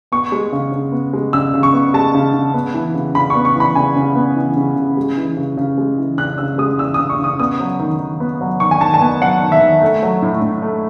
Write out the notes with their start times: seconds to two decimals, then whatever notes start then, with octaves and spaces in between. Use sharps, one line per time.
0.12 B3 C#6
0.32 G#3
0.52 C#3
0.72 C#3
0.92 B3
1.13 G#3
1.33 C#3 E6
1.54 C#3
1.63 C#6
1.73 B3
1.94 G#3 A5
2.15 C#3
2.34 C#3
2.54 B3
2.74 E3
2.94 C#3
3.15 C#3 B5
3.30 C#6
3.35 B3
3.45 C#6
3.56 E3 B5
3.75 C#3 G#5
3.96 C#3
4.15 B3
4.36 E3
4.57 C#3
4.76 C#3
4.97 G#3
5.17 E3
5.37 C#3
5.57 C#3
5.78 G#3
5.98 E3
6.18 C#3 F#6
6.38 C#3 E6
6.58 G#3 D#6
6.78 E3 E6
6.94 D#6
6.99 C#3
7.10 C#6
7.19 C#3
7.24 D#6
7.39 B3 D#6
7.60 F#3
7.79 D#3
7.99 D#3
8.20 B3
8.41 F#3
8.60 D#3 C#6
8.71 G#5
8.81 D#3 A5
8.94 A5
9.01 B3 G#5
9.21 F#3 F#5
9.42 D#3
9.52 E5
9.61 D#3
9.82 A3
10.03 F#3
10.22 A2
10.42 A2
10.62 A3